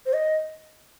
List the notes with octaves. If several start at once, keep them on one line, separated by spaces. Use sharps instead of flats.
C5
D#5